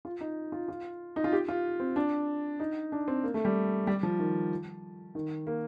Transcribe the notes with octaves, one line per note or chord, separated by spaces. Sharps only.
F4
D#4
F4
F4
D#4
F4
G4
F4
C4
D4
D#4
D4
C4
A#3
A3
G3
G3
F3
D#3
D#3
A#3